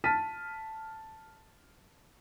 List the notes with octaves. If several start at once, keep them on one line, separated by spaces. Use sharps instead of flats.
A5 F6 A6 B6 D#7